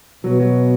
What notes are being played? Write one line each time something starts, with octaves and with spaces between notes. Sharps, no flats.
B2 F#3
F#3